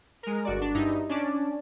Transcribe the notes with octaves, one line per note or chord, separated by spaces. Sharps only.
G#3 A#4
G1 F#4 D5
D4
G2 D#4 E4
C#4 D4 D5